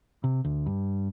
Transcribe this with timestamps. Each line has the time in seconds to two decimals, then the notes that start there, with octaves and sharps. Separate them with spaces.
0.24 C3
0.44 D2
0.66 G2